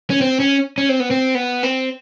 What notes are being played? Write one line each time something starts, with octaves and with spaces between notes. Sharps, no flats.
C#4
C4
C#4
C#4
C4
B3
C4
B3
C4